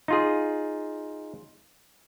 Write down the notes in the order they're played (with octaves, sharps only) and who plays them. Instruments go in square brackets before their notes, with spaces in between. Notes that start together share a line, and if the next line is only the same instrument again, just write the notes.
[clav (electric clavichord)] D#4 F4 G#4